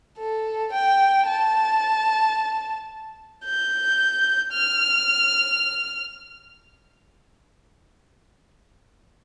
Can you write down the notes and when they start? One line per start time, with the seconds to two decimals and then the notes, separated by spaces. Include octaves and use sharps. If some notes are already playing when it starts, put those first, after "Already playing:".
0.18 A4
0.72 G5
1.27 A5
3.44 G6
4.52 F6